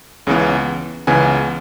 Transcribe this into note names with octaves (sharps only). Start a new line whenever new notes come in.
C#2 C#3 E3 B3
C#2 C#3 E3 B3 G#5